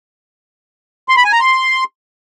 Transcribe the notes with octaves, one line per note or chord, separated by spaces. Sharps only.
C6
B5
G#5
A#5
C6